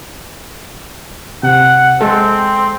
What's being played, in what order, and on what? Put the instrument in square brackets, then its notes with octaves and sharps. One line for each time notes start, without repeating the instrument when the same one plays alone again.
[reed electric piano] C3 [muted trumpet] F#5
[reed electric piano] G#3 A4 [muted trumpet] C4